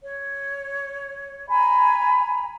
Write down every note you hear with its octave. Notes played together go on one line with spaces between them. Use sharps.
C#5
G#5 A#5 B5